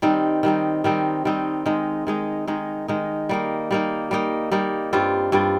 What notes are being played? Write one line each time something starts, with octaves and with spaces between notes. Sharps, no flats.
D#3 G3 C4 D#4
D#3 G3 C4 D#4
D#3 G3 C4 D#4
D#3 G3 C4 D#4
D#3 G#3 D#4
D#3 G#3 D#4
D#3 G#3 D#4
D#3 G#3 D#4
G3 A#3 D#4
G3 A#3 D#4
G3 A#3 D#4
G3 A#3 D#4
G2 G3 C4 F4
G2 G3 C4 F4